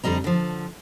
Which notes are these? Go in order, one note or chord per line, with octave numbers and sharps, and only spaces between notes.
F2 D3 G3 D#5 A#5
D3 F3